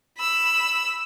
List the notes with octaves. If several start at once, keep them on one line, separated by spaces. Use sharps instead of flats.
B5 E6